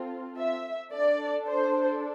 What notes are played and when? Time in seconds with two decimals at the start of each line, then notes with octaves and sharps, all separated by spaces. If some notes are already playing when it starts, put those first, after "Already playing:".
Already playing: C4 F4 A4
0.37 E5
0.92 D4 A4 D5
1.47 C5